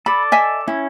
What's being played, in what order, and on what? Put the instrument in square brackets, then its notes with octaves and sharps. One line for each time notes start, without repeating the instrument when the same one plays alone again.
[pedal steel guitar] A4 D5 [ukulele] B5
[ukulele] D#5 E5 G#5
[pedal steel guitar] C#4 [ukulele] E4